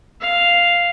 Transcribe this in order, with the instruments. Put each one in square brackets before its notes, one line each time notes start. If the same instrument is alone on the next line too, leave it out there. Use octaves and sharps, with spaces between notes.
[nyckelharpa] F5